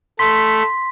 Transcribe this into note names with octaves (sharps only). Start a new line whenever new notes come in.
A3 C6 B6